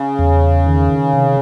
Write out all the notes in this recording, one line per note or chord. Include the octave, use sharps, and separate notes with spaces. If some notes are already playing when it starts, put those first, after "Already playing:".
Already playing: C#3
E2
D#3
C3